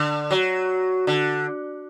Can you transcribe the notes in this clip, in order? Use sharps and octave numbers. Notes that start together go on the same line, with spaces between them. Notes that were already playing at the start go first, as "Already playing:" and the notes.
Already playing: D3
F#3
D3